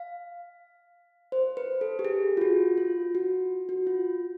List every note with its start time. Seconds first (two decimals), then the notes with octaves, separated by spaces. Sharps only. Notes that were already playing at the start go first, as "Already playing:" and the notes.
Already playing: F5
1.32 C5
1.57 B4
1.81 A4
1.99 G4
2.05 G#4
2.37 F4
2.41 F#4
2.78 F4
3.15 F#4
3.69 F#4
3.87 F4